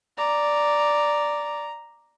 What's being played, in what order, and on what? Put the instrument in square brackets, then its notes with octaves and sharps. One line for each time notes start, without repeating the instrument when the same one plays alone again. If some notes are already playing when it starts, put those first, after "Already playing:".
[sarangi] D5 [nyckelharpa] A#5